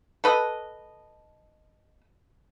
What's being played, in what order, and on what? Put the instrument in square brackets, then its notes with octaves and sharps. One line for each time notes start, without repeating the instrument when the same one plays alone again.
[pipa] A4 B4 D#5